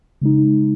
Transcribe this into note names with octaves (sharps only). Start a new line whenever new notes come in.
C#3 G#3 D#4